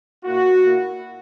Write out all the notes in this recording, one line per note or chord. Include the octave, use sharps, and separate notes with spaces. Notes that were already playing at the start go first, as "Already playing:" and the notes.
A#2 A#3 E4 F#4
A#2 A#3 E4